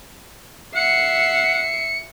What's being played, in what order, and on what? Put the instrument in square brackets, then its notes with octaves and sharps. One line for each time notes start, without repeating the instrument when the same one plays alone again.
[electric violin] E5 C7 [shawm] F#5 [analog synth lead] C#7